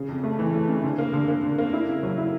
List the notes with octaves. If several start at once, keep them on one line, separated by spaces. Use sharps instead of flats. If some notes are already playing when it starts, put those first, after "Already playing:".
Already playing: C#3
F2
A3
E3
A3
C#3
D3
A#3
D3
A#3
D3
A#3
E4
C#3
F#3
E4